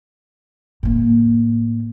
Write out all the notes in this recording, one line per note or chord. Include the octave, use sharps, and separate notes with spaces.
A2 A#3